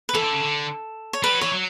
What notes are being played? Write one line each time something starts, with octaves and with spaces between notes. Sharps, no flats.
B4
E3 A4
D3
C#3
D3
C#5
G3 B4
F#3
E3 C#5
F#3